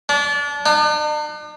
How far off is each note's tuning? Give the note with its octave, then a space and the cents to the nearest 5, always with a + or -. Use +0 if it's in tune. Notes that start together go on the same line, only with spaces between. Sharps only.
D4 -30
D4 +45